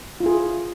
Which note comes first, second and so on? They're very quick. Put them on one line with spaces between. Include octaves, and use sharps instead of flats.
F4 E4 G#4